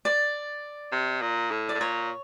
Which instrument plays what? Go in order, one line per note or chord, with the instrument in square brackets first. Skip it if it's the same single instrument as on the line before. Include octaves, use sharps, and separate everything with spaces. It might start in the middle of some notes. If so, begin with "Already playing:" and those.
[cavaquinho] D5
[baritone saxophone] C3
A#2
A2
[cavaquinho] D5
[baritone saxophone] A2
[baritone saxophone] A#2 [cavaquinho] C#5